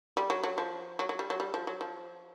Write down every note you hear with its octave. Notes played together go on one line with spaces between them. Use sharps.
G3
F#3
F#3
F3
F#3
F#3
G3
F#3
G3
F3
F#3
F3